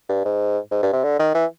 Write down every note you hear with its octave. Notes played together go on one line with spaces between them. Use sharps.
G2
G#2
G#2
G2
C3
D3
D#3
E3